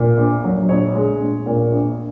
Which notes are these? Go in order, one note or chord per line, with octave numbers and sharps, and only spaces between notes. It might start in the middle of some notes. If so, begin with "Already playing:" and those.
Already playing: A#2
A#1
F#3
A#1 C#5
G#3
A#1
A#2
A#1